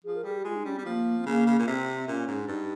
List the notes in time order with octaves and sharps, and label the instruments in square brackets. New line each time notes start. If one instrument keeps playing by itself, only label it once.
[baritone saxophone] F3 [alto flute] G#4
[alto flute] A#4
[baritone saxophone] G3 [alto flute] G#4
[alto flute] G4
[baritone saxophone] G#3 [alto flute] F4
[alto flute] D#4
[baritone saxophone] G3 [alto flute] C#4
[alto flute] C4
[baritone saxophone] G3
[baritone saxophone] F3 [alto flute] A#3
[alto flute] C4
[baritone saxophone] C#3 [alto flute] A#3
[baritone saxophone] C#3
A#2
[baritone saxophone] C3 [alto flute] C4
[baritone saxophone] A#2 [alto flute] C#4
[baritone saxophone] G#2
[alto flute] C#4
[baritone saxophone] G2 [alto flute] D#4